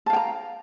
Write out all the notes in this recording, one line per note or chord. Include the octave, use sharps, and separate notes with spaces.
F5 G5 A5 A#5